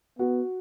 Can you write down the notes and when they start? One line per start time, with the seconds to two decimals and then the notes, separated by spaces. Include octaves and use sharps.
0.19 B3 F#4